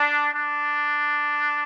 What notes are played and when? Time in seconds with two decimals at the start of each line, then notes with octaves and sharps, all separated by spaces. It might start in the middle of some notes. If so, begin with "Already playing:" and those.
Already playing: D4
0.33 D4